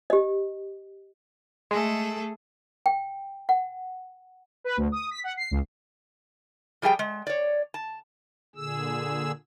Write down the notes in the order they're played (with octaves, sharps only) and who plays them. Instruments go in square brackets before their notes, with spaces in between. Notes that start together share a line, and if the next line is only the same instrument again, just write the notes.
[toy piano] G4 D#5
[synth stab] G#3 [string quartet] A3 G#4 A4
[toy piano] G5
F#5
[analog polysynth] B4
D2
D#6
B6
F#5
C7
C#2
[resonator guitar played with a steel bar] F3 G3 G#4 F#5 G5
G#3
C#5 D5
A5
[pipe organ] A#2 D3 G#4 E6